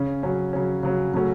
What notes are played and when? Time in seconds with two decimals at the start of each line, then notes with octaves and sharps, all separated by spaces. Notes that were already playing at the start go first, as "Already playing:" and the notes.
Already playing: C#3 C#4
0.23 C#3 F#3 C#4
0.53 C#3 F#3 C#4
0.83 C#3 F#3 C#4
1.14 C#3 F#3 A3 C#4 F#4